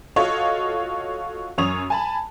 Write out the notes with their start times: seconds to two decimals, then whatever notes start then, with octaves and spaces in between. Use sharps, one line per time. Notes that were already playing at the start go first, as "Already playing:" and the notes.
0.16 F4 F#4 A4 C#5 D#5 F5
1.58 F#2 C#5 D#6 F7
1.90 G#5 A5 B5